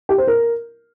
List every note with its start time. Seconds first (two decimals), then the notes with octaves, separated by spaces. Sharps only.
0.09 G4
0.18 C5
0.28 A#4